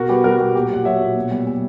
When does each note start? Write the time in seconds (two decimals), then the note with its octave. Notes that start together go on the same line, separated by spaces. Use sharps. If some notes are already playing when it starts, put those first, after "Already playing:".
Already playing: B2 F#4 A#4
0.09 G3 G4 B4
0.24 G3 F#4 A#4
0.39 B2 G4
0.54 A#2 G4
0.70 F#3 F#5
0.85 F#3 C#5 E5
1.01 A#2
1.16 B2
1.31 G3
1.47 G3